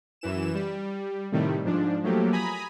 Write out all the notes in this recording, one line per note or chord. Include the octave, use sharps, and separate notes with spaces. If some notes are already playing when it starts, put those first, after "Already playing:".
F#2 E3 E7
G3
A2 C3 D#3 G3 A3
G#2 F3 D4
F3 F#3 A3 A#3 G4
G#5 A#5 B5 D#6